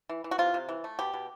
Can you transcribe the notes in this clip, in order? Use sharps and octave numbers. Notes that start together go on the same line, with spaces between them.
E3
E3
F#4
C3 F4
C3
E3
A3
B2 G4
B2